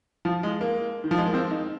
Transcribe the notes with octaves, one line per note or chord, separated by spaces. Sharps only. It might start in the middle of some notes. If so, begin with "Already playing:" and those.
F3
G#3
A#3
D#3
F3
G#3
A#3
C4
D#4